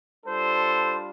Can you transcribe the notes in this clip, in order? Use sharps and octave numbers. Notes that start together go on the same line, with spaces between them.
G3 D4 F4 A4 C5